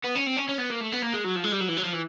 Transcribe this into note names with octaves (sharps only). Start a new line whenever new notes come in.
B3
C#4
C4
C#4
C#4
B3
A#3
A3
B3
A#3
G#3
F#3
F3
G#3
G3
F#3
E3
F#3
F3
E3